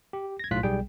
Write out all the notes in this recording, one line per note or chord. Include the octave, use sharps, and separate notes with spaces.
G4
G#6 A#6
B1 A2 F4 C6 F#6 B6
B1 G3 G#4 G5